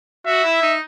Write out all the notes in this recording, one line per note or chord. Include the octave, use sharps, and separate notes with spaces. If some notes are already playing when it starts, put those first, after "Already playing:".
F#4 E5
E4
D#4